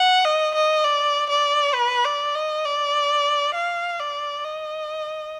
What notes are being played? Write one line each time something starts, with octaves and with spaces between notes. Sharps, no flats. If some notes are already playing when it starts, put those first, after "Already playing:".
Already playing: F#5
D#5
D#5
D5
D5
B4
D5
D#5
D5
F5
D5
D#5